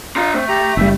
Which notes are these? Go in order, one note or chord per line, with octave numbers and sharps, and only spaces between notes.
D4 F4 A#5
A3 C4
G4 A#5
F#1 G3 E5